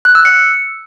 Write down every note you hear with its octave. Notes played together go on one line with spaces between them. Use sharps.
F#6
E6
C#7